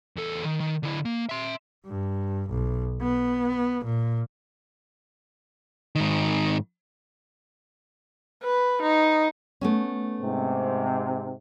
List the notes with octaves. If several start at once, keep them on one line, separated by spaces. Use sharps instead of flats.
E2 A4
D#3
D#3
D3 E4
A#3
E5 C6
G2
B1
B3
A#2
G#2 D#3
B4
D#4
A3 B3 C#4
G#2 C3